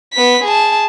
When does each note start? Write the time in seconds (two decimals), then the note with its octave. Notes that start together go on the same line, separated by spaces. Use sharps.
0.13 B3 B6
0.44 G#4 A5